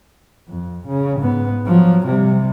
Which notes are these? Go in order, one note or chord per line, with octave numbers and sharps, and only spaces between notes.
F2
C#3
G#2 B3
F3 F#3
C3 G3